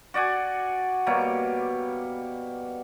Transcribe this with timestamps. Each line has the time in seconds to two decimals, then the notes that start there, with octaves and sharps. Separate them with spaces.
0.14 F#4 D5 F#5 G#5
1.06 B2 G3 A#3 C#5